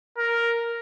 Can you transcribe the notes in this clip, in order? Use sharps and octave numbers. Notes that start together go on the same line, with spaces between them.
A#4